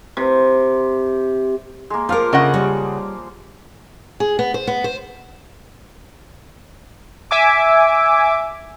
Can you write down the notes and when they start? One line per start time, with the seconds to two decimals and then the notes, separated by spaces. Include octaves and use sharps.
0.17 C3
1.90 G#3 A#3
2.09 F3 F4 A#4 F5 D6
2.33 C#3 D#5 F#5
2.54 G3 C#5
4.20 G#4
4.39 B3
4.54 C5
4.67 B3
4.84 C5
7.31 E5 G#5 D6